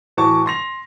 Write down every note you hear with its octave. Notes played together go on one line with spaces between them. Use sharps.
A2 E3 F#4 A5 C#6 D6
C6 A#6 F7